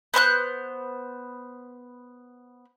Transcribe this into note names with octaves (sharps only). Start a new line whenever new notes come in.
B3 C5 A#5 F#6